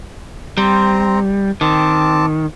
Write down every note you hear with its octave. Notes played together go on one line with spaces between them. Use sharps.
G3 C4 C5 A#5
D#3 C4 A5 D6